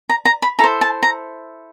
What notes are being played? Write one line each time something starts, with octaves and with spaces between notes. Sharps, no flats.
A#5
A#5
B5
E4 A4 C5 A#5
A5
A#5